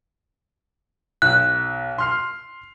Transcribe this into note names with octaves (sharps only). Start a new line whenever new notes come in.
B1 F#6
C6 F6 C7